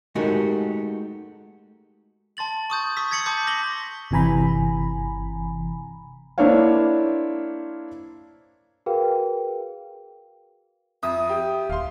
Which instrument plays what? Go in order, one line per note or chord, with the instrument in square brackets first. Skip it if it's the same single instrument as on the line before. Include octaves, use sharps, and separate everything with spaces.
[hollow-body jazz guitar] G#3 A3 D#4 F#4 G4 A#4
[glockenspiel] A5 C6 A6 F#7
C#6 D#6 G6 A6
C#6 D#6 E6 B6
G#6 A6 B6 C#7 F#7
A5 C6 D6 G6 B6
E6 A#6 F#7 G7
[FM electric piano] G1 C3 E3 G#5 A#5 B5
[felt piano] A#3 D4 E4 C5 C#5 F5
[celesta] F#4 G#4 A#4 B4 F5 G5
[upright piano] F2 D#6 [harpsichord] E5
[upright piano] G4
[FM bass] D1 [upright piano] F5 C6